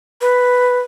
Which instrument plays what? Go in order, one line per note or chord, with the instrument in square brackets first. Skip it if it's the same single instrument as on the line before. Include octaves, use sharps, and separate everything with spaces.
[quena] B4